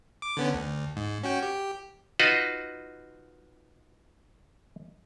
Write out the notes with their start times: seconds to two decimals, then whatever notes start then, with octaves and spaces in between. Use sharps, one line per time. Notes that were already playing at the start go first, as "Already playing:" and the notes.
0.22 D6
0.37 D3 B3 C#4
0.54 D2
0.96 G#2
1.24 C#4 F#4 G5
1.43 G4
2.19 D#4 F4 F#4 B4 D#5